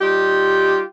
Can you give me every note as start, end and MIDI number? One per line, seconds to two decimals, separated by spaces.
0.01 0.80 55
0.01 0.80 63
0.01 0.80 65
0.01 0.80 67